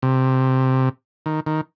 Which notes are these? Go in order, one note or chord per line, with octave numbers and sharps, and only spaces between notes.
C3
D#3
D#3